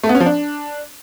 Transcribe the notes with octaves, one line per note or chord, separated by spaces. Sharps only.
A3
B3
C#4
F3
D4